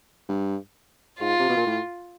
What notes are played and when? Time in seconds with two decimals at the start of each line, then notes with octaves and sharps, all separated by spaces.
0.29 G2
1.20 G#2 F4
1.40 C3
1.49 B2
1.57 A#2
1.66 A2